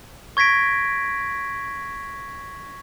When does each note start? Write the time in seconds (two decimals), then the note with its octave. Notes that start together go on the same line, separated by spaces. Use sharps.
0.37 C#6 G#6 A#6 B6 D7